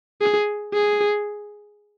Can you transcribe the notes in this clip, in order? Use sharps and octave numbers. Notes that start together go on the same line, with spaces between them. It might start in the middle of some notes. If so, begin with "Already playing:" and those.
G#4
G#4